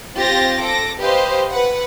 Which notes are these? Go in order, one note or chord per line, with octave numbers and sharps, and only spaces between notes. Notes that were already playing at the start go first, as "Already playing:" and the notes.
C4 F4 G4 A6 A#6
A4 D6 A#6
G4 B4 C5 D#5 F5
B4 F#5